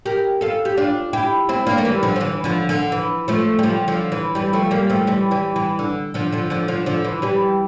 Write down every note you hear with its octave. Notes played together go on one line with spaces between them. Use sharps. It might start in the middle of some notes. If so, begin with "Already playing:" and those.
G4 A#4
F4 A4
G4
D4 F4
E4 G4
C4 E4
A#3 D4
A3
E3 G3
D3 F3
F3
E3
D3 F3
D3
E3
F3 A3
G3
D3 F3
D3 F3
E3
E3 G3
F3 A3
G3 A#3
F3 A3
E3 G3
E3 G3
E3
D3
D3 F3
D3 F3
D3 F3
D3 F3
D3 F3
E3
E3 G3